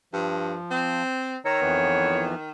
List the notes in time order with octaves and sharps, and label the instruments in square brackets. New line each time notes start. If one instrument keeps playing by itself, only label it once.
[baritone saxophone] G2 [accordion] F3
[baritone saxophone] C4
[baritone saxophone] D#3 [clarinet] C#5 [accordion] A#5 E6
[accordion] F2 E3 B3